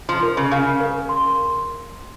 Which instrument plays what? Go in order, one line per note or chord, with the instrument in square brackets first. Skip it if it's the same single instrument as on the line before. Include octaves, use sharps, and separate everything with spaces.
[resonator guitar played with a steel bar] F3
[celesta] A#4
[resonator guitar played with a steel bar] C#3
[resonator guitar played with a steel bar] C#3 [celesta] F5
[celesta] A#4
C6